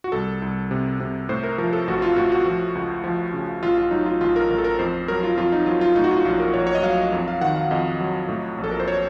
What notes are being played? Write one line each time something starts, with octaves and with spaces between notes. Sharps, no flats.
F#4
C2 A4
C2
C3
C3
A2 C5
A#4
F3 A#4
A4
A1 F#4
F4
A2 F#4
F#4
F3
C#2
F3
C#3
A1 F4
F4
F#3 D#4
F4
A1 F4
A#4
A1 A#4
A4
A#4
F2 C5
F#3 A#4
F4
F2 F4
D#4
F#3 F4
F4
A2 D#4
F#4
F4
A#1 F4
A#4
A#1 C#5
C#5
D#5
F#3 F5
F2
F5
D#3 F#5
F5
F2 D#5
F#3
A2
A#1
A4
A#4
C5
C#5